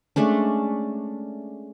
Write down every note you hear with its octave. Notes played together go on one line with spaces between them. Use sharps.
G#3 A3 C#4 D4